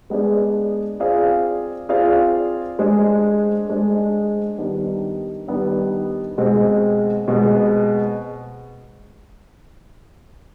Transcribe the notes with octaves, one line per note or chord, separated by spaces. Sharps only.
G#3 B3 D4 G#4 D5
C4 F4 G#4 D5 F5
C4 F4 G#4 D5 F5
G#3 D4 G#4 C5
G#3 D4 G#4 C5
D#3 G3 B3 D4
D#3 G3 B3 D4
B2 G#3 C4
B2 G#3 C4